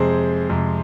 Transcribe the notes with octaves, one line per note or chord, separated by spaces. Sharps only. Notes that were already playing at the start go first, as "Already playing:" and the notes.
Already playing: F2 C3 G#3 G#4 C5
F2 C3 G#3